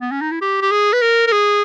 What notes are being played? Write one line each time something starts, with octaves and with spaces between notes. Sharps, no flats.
B3
C#4
D#4
E4
G4
G4
G#4
B4
A#4
A#4
G#4